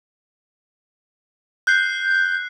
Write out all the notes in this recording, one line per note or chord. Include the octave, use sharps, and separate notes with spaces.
F#6 G6 C7